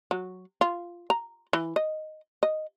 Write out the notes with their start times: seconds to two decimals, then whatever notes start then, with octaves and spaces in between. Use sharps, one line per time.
0.11 F#3
0.61 F4
1.10 A#5
1.53 E3
1.76 D#5
2.43 D#5